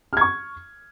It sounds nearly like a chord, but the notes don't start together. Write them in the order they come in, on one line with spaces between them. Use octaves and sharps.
F6 G#6 C#6